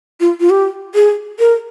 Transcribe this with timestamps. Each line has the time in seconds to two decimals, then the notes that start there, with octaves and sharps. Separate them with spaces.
0.20 F4
0.40 F4
0.50 G4
0.94 G#4
1.39 A#4